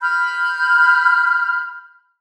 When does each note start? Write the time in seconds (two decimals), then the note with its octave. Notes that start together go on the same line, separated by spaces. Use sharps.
0.02 B5 F6 G6